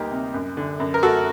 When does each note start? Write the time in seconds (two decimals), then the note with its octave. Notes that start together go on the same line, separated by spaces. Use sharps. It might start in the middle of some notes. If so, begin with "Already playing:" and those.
Already playing: D2 G3 A#3 D#4 G4
0.11 C3
0.34 F#2
0.57 D3
0.80 F#2
0.94 A#4
1.03 A3 F#4 A4